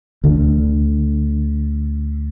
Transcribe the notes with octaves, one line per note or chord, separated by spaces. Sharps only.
D2 D3